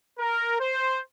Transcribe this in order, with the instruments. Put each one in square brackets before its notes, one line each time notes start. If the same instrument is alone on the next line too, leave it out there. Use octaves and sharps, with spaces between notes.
[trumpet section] A#4
C5